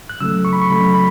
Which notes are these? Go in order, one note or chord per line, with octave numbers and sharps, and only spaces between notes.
F#6
C#3 F#3 A3 E6
C#6
B5
C#6
C#3 F#3 A3 B5
B5